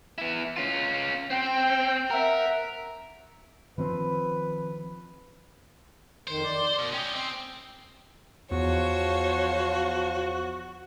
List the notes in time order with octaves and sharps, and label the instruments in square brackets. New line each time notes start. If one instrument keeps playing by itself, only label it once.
[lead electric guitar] B3 E4
C#4 F4
[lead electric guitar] C4 [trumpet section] G5
[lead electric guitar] A#4 [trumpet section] E5 F#5
[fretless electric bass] D#3 F3 C4 [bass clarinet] B4
[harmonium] F2 D#3 [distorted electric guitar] C5
[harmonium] D5
[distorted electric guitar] B2
[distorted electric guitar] C#4 D#5 [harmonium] G5
[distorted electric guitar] C4
[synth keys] E2 [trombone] F3 [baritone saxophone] F#4 [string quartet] C5 C#5